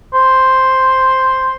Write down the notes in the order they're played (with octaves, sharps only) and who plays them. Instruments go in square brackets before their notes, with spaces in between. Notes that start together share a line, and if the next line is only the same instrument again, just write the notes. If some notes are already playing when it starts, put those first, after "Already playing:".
[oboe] C5